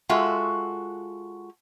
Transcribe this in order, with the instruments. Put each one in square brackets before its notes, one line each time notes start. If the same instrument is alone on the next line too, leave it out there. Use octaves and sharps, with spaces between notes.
[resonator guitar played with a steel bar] G#3 F4 F#4 A4 E5